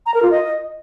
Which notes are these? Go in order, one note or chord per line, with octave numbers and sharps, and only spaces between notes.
A#5
A#4
F4
D#5